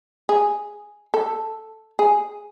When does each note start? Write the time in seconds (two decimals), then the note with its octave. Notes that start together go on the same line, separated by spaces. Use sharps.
0.29 G#4
1.14 A4
1.99 G#4